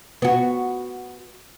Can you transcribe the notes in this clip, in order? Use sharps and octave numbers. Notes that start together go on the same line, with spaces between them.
B3 F#4